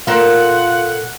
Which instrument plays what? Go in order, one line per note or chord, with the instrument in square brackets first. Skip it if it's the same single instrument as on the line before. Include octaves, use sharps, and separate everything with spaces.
[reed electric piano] A#2 [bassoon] F4 [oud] A4 A#4 C5 [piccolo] F#5